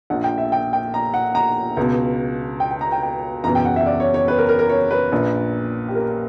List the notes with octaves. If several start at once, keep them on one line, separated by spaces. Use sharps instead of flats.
A#1 A#2 F#5
G5
E5
G5
G5
A#5
F#5
A#5
C#2 B2
G5
G5
A#5
G5
G5
F#1 E2 B2 A#5
G5
F#5
E5
D5
C#5
C#5
B4
A#4
A#4
A#4
C#5
B4
A#1 A#2
G4
A#4